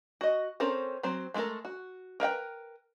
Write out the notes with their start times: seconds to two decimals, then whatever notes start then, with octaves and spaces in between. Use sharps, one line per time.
0.21 F#4 D#5
0.60 C4 C#4 A4 A#4 C5
1.03 F#3 C4 C5
1.34 G#3 A3 E4 A4 A#4
1.65 F#4
2.20 A#4 B4 F5 G5